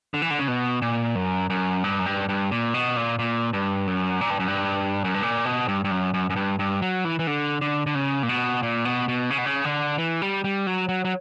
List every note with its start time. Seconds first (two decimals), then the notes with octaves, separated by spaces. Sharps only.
0.14 D3
0.22 E3
0.30 D3
0.39 C#3
0.48 B2
0.82 A#2
1.15 F#2
1.50 F#2
1.84 G2
1.99 F#2
2.06 G2
2.29 G2
2.51 A#2
2.74 B2
2.96 A#2
3.19 A#2
3.53 G2
3.87 F#2
4.21 A#2
4.30 G2
4.39 F#2
4.48 G2
5.04 F#2
5.14 G2
5.23 A#2
5.45 B2
5.68 G2
5.84 G2
5.91 F#2
6.14 F#2
6.30 F#2
6.36 G2
6.59 G2
6.82 F#3
7.05 E3
7.19 E3
7.27 D3
7.61 D3
7.86 D3
7.95 C#3
8.23 A#2
8.29 B2
8.63 A#2
8.85 B2
9.08 B2
9.30 C#3
9.38 B2
9.46 C#3
9.65 D3
9.98 E3
10.22 G3
10.44 G3
10.67 F#3
10.89 F#3
11.05 F#3